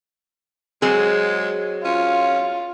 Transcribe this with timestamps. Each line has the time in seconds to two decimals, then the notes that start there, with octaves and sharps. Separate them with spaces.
0.82 F#3 G#3 C4 G#4
1.85 C#4 F4